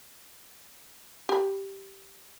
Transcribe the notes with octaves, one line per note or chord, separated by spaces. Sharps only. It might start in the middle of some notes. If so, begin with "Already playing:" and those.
G4 B5